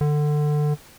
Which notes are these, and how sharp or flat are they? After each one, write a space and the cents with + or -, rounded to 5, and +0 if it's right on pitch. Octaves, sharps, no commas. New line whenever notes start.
D3 +20